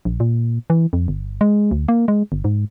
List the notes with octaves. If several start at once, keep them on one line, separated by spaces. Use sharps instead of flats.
A#1
A#2
E3
F2
G1
G#3
D2
A#3
G#3
G1
G#2